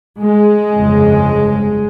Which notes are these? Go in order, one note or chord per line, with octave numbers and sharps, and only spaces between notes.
G#3
G1 F2 C#3